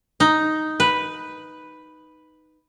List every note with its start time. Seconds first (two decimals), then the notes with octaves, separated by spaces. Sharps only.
0.20 D#4
0.80 B4